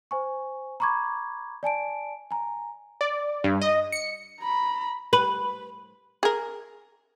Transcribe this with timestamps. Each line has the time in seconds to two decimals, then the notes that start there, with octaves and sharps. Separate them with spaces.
0.11 C5 G#5 C#6
0.80 A#5 B5 C#6 D6 G#6
1.63 D5 G#5 A5 D7
2.31 G#5 A#5
3.01 D5
3.44 G2
3.61 D#5
3.92 C#7
4.40 A#5 B5
5.13 B4
6.23 G#4 A#4